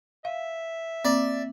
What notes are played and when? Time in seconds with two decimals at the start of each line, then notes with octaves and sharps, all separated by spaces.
0.25 E5 F5
1.05 A#3 C4 D5